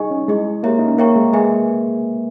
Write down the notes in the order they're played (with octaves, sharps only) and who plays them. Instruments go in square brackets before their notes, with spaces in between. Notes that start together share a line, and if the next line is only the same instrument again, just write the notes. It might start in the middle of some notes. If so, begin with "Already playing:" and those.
Already playing: [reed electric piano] G3 D#4 [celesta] G#4 D#5 G#5 C#6
[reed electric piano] C#4
[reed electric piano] G#3 [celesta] E4 G#4 D#5
[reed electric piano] A#3 [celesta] G4 C#5 E5 A#5
[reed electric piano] D#4
C#4
[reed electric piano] A#3 [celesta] C#5 E5 G5 A#5 C#6
[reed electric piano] G#3
[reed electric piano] G#3 [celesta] G#4 B4 E5 G#5